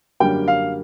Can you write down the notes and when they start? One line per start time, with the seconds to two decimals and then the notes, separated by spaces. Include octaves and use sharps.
0.20 F#2 D3 G3 A#3 G5
0.48 F5